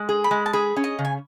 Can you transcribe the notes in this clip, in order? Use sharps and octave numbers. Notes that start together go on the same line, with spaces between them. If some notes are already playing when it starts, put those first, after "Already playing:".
Already playing: G#3
G#4
B5
G#3
A5
G#4 B5
C#4
D#5
C#3
G#5